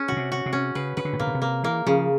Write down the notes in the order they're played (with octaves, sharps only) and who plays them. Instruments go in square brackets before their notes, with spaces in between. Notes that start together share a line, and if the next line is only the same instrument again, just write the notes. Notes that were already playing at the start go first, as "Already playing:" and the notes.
Already playing: [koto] C#4
[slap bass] C#3 [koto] F#4
[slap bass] C3
[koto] F#4
[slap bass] C3
[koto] C#4
[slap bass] C#3 [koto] B4
[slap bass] C#3 [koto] B4
[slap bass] D3
A2
[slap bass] A#2 [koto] A#3
[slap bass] B2
C3
[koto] A#3
[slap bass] E3 [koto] A#3
[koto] C#3 [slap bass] F3